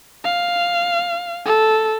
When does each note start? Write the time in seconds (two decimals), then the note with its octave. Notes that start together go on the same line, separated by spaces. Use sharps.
0.24 F5
1.45 A4